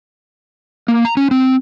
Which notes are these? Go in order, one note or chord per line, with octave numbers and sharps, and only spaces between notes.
A#3
A#5
C#4
C4